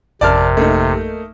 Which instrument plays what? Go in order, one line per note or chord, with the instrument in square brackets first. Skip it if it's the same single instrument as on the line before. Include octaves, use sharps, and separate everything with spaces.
[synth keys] G#1 F2 A#4 [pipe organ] C3 [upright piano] D5 A5 F6
[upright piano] A3 A#3 D#4